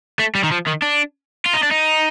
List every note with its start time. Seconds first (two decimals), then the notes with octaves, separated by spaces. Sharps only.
0.19 A3
0.35 G3
0.44 D#3
0.51 F3
0.67 D#3
0.82 D4
1.46 F4
1.54 D#4
1.63 D4
1.72 D#4